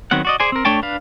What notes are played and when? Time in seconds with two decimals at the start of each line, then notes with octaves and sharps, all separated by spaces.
0.11 D#3 F#3 B3 C4 F#5
0.25 F#4 D5 D#5
0.40 G#4 C5 D5 G#5
0.52 C4 A#4
0.65 A3 D4 C#5 G5 A5
0.83 D4 B4 F5